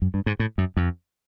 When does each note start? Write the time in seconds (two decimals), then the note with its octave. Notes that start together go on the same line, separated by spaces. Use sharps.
0.02 F#2
0.14 G2
0.26 G#2
0.39 A2
0.58 F#2
0.77 F2